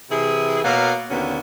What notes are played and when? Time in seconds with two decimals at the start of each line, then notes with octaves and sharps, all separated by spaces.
0.10 C3 E3 E4 G#4
0.64 B2 A#3 B3 A#4 C#5 F5
1.10 D#2 B2 D3 A#3 B3 C#4